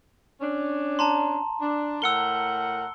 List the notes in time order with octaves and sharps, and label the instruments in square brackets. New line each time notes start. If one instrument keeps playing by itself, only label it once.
[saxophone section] C#4 D4
[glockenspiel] A5 A#5 C6
[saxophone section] D4
[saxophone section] A2 A#4 F#5 [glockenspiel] E6 C#7 G7